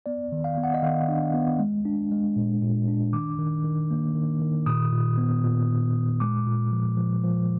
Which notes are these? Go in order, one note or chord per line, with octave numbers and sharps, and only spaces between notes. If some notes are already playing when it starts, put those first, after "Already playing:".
B3 D5
D#3
F5
B3
F#5
D#5
D#3 F5
D4
B3
G#3
D4
G#3
A#2
A#2
D4
D#3 D6
D#3
D#3
A#3
D#3
D#3
A#2 D#6
A#2
B3
A#2
A#2
A#2
G#3 D6
A#2
F3
F3
F3